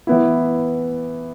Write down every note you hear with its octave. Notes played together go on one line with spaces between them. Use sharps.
E3 B3 E4